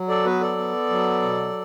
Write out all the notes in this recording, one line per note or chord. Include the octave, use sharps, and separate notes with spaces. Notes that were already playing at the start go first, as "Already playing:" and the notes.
Already playing: F#3
A4 D5
B3 F#4 B4
A4 D5
B3
F#3
B2